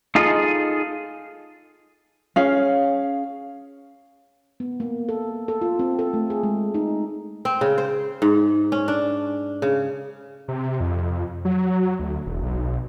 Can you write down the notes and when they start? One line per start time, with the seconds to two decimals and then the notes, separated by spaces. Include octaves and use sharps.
0.15 D#4 F4 G#4 A4 D#5
2.36 C#4 G#4 F5
4.60 B3
4.80 A#3
5.09 A4
5.48 A4
5.61 F4
5.79 C4
5.99 A4
6.13 A3
6.30 G#4
6.43 G#3
6.74 D#4
7.45 C4
7.61 C#3
7.78 C5
8.22 G#2
8.72 C#4
8.88 D4
9.62 C#3
10.48 C3
10.80 F2
11.45 F#3
11.99 D2
12.26 E1
12.42 B1